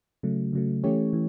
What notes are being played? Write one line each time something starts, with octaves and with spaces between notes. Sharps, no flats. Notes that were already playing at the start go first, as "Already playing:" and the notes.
C#3 F#3 A3
C#3 F#3 A3
E3 A3 C#4 G4 C#5
E3